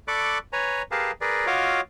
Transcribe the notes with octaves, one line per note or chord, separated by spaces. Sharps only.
A4 D5 B5 C#6 D6 F#6
B4 C#5 G#5 A#5
G4 G#4 A#4 B4 F5 A5
G#4 A#4 B4 D5
F4 F#4 C#5 D#5 F5 D6